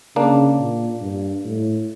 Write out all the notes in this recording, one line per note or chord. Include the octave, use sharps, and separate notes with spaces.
C#3 A#3 D4
A#2
G2
A2